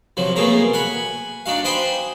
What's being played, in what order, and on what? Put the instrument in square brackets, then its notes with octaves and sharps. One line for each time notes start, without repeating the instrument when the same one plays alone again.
[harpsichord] C2 F3 F#3
B2 A3 A#3 G#4 A#5
F#5 G#5 B5
D4 D#4 F#4 F5
C5 D#5 G5 G#5 B5 C6